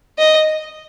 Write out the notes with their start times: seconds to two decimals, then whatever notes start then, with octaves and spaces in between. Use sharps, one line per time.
0.18 D#5